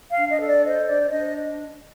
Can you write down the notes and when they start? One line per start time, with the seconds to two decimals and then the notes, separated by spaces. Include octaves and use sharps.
0.10 F5
0.16 D4
0.28 D#5
0.39 A4
0.46 D5
0.64 C5 D#5
0.86 D4 D5
1.10 D4 D#5